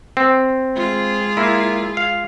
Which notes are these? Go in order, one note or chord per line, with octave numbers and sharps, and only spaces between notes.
C4
G#3 F4 G#4
A#3 E4
F5